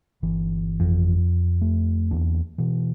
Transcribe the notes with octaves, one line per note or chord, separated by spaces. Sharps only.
G1 E3
F2
A3
E2 A#3 D4
B2 E3